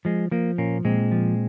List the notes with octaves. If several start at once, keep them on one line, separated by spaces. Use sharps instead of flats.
F3 G#3
F3 A#3
A#2 A#3 C#4
A#2 G#3 C4
F3